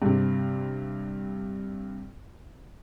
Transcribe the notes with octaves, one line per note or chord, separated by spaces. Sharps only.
G2 C3